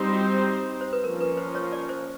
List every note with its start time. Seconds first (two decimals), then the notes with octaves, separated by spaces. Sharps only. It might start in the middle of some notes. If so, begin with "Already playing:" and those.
Already playing: G3 C4 D#4 G4 C5
0.09 F4
0.13 F#4
0.81 C5
0.93 B4
1.04 F3 A#3 C#4 A#4
1.20 B4
1.37 C5
1.55 C#5
1.72 D5
1.89 C5